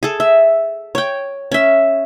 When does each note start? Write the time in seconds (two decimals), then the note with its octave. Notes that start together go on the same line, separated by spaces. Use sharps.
0.03 G#4 A4
0.20 E5
0.95 C#5 G5
1.52 C#4 E5